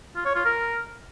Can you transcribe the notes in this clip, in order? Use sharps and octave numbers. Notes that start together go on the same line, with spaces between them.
F4
C#5
F4
A#4